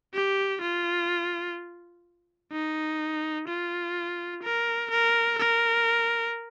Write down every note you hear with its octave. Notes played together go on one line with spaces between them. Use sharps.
G4
F4
D#4
F4
A#4
A#4
A#4